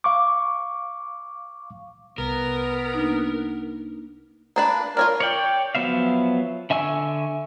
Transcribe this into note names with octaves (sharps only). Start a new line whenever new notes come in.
F5 C#6 D6
C2 B3 A#4
A#3 D4 D#4
A#3 D4 B4
F4 A#4 C#5 D5
C#5 D5 G5
F3 F#3 B3 E5 F5
D3 E5 G#5 C#6 E6